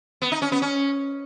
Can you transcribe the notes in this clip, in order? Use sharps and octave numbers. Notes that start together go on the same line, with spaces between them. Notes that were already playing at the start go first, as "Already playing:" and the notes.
B3
D#4
C#4
B3
C#4